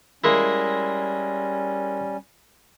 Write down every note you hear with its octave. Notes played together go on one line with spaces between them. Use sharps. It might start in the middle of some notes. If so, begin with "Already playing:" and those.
G3 G#3 A#3 C#4 E4